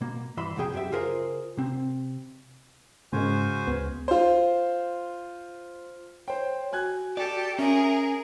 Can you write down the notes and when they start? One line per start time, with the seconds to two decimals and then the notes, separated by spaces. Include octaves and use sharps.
0.01 B2 A#3
0.37 G2 E3 E5 B5 C6
0.56 C2 F2 A#2 F3 G#4 G5
0.73 F#2 G4 C#5 E5
0.92 C#3 F4 G#4 A#4 C5
1.57 C3 C4
3.13 G#2 C#3 G#3 F#4 C5 G#5
3.67 D2 B3
4.08 F4 C5
6.28 C5 C#5 G5
6.73 F#4 G#5 F#6 G#6
7.17 G4 A4 D5
7.59 C#4 G#4 A#4 E5